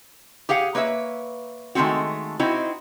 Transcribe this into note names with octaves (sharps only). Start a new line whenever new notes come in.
G4 G#4 F5 F#5
A#3 B4 C#5 E5
D#3 G#3 A3 C4 F#4
C4 D#4 E4 F#4